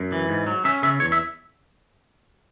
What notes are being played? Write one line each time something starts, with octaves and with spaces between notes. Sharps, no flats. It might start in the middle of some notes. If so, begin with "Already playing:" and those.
Already playing: F#2
E3
G#2
F#3
C#4 E5
C#3 E5
E2 C#5
E5